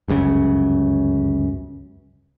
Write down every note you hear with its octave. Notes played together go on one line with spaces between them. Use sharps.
G1 C#2 F#2 C#3